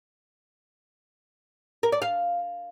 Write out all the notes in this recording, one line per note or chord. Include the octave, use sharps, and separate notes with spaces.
A#4
D5
F5